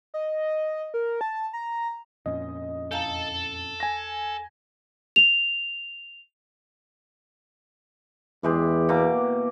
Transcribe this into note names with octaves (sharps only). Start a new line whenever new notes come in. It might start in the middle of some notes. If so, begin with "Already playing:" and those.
D#5
A#4
A5
A#5
F2 A#2 C#4 D#5
E2 A4 F5 A5 A#5
G#5 A#6
F7
E2 E3 G#3 G4
B2 A#3 D6